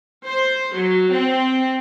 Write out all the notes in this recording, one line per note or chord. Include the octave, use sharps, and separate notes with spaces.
C5
F#3
C4